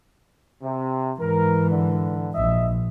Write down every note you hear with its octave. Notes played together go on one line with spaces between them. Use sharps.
C3
G#2 E3 A#4
D3
A#1 D#5 E5